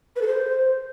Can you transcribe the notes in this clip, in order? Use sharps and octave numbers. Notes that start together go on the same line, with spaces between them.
B4
A4
C5